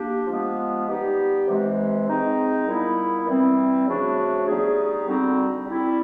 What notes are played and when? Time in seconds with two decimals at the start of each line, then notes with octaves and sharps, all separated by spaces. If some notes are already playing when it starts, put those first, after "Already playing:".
Already playing: A#3 D4 G4
0.27 F3 G#3 B3
0.87 G3 B3 D#4 G4
1.48 C3 E3 G#3
2.08 G#3 C4 D#4
2.67 A#2 G3 B3 E4
3.27 E3 G3 C4
3.87 C#3 F3 A3 D4 F#4
4.47 G3 B3 D#4 G#4
5.07 D3 G3 C4 D#4 F#4
5.66 G3 C4 E4 G4